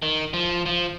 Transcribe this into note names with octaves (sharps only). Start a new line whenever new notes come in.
D#3
F3
F3